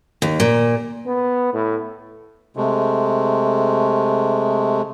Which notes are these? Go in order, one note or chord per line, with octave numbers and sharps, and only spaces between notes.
D#2
A#2
B3
A2
C3 G#3 A3